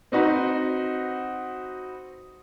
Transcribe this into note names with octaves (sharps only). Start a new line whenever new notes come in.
C4 D#4 F#4 B4